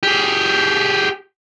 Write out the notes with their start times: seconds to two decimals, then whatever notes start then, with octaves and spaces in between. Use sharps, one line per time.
0.03 G4 G#4